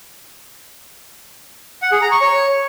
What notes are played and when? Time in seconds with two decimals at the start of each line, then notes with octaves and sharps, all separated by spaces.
1.82 F#5
1.92 G#4
2.02 A#5
2.12 C#6
2.21 C#5